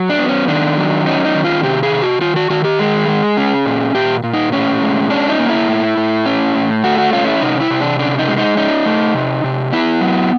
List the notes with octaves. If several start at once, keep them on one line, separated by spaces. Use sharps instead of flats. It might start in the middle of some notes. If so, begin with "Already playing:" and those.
Already playing: F#3
D4
B3
C#4
D#3 D4
F#3
C#4 D#4
D#4
D#3
F4
C3 G4
G#4
C3
F#4
D#3 F4
F#4
D#3 F#4
G4
G#3 G#4
G#3
C#4
A#2
A#2 G4
A#2
D#4
A2 C#4
G#3
C#4 D4
D#4
A#3
E4
A2
A2
C#4
A2
A3 F#4
F#4
C#4 F4
E4
C3 D#4
E4
C3
D4
C#3 D4
D#4
G#3
D#4
C#4 D#4
A3
C3
C3
B3 E4
F#3